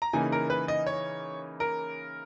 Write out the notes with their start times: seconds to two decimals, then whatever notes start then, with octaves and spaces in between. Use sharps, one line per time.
0.02 A#5
0.13 C#3 E3 A#3 D#4 G#5
0.32 A#4
0.50 B4
0.68 D#5
0.87 C#5
1.60 A#4